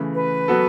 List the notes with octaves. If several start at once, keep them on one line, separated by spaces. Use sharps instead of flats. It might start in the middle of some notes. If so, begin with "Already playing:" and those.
Already playing: C#3 E3 A3
B4
F#3 B3 F#4 A4